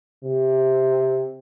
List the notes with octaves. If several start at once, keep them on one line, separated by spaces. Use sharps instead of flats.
C3